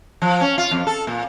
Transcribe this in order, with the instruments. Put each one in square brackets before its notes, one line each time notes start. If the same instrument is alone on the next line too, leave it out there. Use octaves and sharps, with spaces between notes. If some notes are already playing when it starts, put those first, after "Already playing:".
[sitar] F3
C#4
F4
F2
A4
A#2